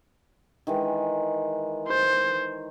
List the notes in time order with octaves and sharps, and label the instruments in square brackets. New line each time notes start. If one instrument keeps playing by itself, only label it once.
[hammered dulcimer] D#3 E3 G#3
[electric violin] C5